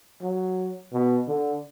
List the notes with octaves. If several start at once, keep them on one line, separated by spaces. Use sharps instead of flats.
F#3
B2
D3